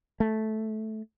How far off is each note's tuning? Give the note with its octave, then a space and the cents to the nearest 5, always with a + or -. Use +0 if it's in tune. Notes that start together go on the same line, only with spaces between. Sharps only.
A3 -10